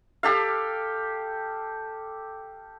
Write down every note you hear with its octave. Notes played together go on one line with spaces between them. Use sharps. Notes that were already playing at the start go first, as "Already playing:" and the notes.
G4 A4 F5